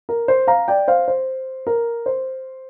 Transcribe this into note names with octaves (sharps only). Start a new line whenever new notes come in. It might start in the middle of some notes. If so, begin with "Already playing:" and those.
A#4
C5
F5 A#5
D5 G5
C5 F5
C5
A#4
C5